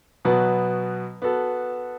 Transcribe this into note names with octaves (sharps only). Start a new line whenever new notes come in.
B2 F#3 B3 F#4
B3 F#4 A4